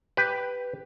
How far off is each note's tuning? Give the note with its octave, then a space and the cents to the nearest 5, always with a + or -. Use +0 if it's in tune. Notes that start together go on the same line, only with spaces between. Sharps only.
G4 +0 B4 +5